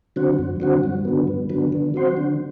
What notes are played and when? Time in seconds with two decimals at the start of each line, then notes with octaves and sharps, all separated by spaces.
0.16 D3 F#3 C4 F#4
0.39 F#2
0.60 D3 F#3 C4 F#4
0.83 G2
1.05 D3 F#3 B3
1.28 G2
1.49 D3 F#3 B3
1.72 D3
1.94 F#3 C4 F#4 C5
2.17 D3